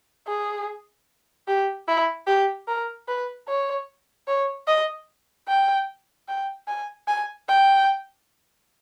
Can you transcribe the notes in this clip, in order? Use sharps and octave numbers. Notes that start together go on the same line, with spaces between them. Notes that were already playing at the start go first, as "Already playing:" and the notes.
G#4
G4
E4
G4
A#4
B4
C#5
C#5
D#5
G5
G5
G#5
G#5
G5